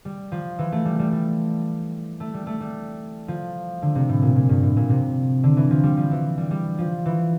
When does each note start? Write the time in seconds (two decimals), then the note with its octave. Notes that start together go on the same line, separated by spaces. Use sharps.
0.05 G3
0.32 F3
0.59 E3
0.72 A3
0.85 G3
0.99 G3
1.12 G3
2.20 A3
2.34 G3
2.47 A3
2.60 G3
3.28 F3
3.82 D3
3.95 C3
4.09 A2
4.22 A#2
4.36 A#2
4.49 G2
4.63 A2
4.77 A#2
4.90 C3
5.44 D3
5.57 E3
5.71 F3
5.83 G3
5.97 F3
6.11 E3
6.38 G3
6.51 G3
6.79 F3
7.06 E3